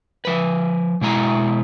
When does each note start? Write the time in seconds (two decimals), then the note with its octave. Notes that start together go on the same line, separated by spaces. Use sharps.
0.25 F3 B4
1.01 B2 G#3 E4 A#5